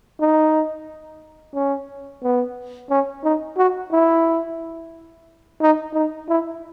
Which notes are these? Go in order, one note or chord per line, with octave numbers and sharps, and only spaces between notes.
D#4
C#4
B3
C#4
D#4
F#4
E4
D#4
D#4
E4